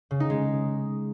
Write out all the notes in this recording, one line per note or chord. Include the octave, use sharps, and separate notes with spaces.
C#3
D#4
G#3